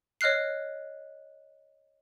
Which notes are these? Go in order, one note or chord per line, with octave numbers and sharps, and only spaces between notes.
C#5 D#5 F6 F#6 C7